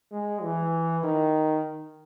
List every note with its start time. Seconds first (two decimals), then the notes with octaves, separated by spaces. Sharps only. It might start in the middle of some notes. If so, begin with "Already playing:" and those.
0.12 G#3
0.43 E3
1.04 D#3